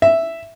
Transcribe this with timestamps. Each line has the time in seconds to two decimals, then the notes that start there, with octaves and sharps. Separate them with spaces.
0.02 E5